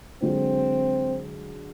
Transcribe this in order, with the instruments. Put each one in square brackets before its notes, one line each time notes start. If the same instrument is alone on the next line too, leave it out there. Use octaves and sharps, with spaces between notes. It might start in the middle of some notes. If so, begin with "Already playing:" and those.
[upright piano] D3 F#3 G#3 [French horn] C4